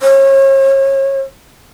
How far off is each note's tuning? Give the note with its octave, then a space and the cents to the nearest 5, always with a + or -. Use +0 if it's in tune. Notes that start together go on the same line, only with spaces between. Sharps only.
C#5 -35